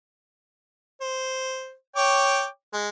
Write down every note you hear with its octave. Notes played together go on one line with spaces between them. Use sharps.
C5
C#5 G5 D6
G#3